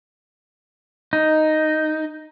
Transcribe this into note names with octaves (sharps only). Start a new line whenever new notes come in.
D#4